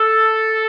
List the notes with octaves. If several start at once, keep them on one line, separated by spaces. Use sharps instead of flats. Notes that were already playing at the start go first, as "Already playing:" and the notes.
Already playing: A4